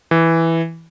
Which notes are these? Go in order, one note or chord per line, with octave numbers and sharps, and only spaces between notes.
E3